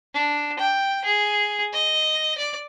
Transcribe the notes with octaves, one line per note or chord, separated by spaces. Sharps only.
D4
G5
G#4
D#5
D5